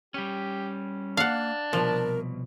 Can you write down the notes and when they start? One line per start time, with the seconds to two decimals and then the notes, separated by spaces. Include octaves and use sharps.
0.14 G3 C#4 G4
1.17 A#3 D4 F5 F#5
1.73 C2 B2 F3 A#4